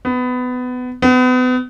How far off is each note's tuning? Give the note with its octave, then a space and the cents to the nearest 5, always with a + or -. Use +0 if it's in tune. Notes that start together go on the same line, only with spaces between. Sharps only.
B3 +20
B3 +35